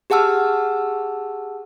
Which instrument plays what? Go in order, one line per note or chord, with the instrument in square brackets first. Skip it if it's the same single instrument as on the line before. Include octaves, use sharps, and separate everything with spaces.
[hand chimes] G4 G#4 F#5 A5 E6 F6